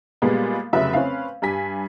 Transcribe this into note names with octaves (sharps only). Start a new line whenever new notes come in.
A#2 G3 G#3 B3
F1 C#3 F#3 B4 E5
C4 C#4 B4 F5
G2 G3 G#5 B6